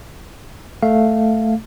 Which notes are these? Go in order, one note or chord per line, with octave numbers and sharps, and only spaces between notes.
A3 F5